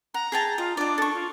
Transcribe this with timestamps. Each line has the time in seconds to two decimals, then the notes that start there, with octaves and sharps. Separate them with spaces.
0.14 F#5 A#5
0.32 G#4 G5 A5
0.58 F4 D#5
0.77 D4 D5 D#5
0.98 A4 C#6
1.14 F4